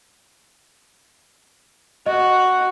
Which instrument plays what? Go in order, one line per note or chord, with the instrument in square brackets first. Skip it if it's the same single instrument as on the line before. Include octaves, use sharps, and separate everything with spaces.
[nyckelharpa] F#4 [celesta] D#5